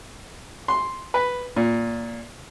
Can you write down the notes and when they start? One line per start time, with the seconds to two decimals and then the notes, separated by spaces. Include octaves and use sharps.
0.68 C6
1.14 B4
1.56 A#2